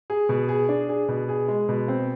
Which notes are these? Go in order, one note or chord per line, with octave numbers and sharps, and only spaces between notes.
G#4
B2
G#4
D4
G#4
B2
G#4
G#3
B2
C4